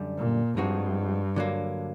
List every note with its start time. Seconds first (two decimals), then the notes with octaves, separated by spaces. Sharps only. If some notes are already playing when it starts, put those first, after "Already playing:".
Already playing: F#2 D3 G3
0.18 A#2
0.57 G2 F3 G#3 C4 D#4 F#4
1.36 D3 F#3 A#3